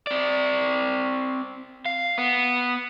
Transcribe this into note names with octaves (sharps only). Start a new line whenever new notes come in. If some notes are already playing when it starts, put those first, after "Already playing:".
C4 D5
F5
B3